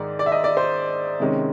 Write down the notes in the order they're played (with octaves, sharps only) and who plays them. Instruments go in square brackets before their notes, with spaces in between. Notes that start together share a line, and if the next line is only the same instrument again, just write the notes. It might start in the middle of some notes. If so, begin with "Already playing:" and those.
Already playing: [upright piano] G#2 D#3 G#3 D5
D5
E5
D#5
D5
C5
C3 D#3 G#3 C#4